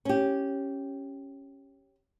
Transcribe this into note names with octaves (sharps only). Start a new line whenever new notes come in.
C#4 G4